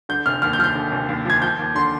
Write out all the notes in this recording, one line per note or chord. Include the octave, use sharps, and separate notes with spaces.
D3 G6
F1 F6
D#2 F6
G6
F3 F6
G6
D3
F1
D#2
F3 G#6
F3 G6
D#2
D3 C6